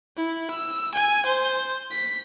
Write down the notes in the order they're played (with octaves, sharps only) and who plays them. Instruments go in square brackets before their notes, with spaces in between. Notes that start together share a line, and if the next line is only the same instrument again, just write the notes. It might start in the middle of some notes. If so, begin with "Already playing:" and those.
[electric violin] E4
E6
G#5
C5
B6